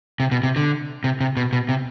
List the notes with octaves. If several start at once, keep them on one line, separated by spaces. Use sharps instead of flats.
C3
B2
C3
D3
C3
C3
B2
B2
C3